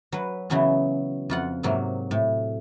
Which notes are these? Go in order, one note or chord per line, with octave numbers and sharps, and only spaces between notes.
F#3 B4
C#3 E3 F#3 B3 C#4
F2 F4 F#5
G#2 C3 F#3 A#3
A2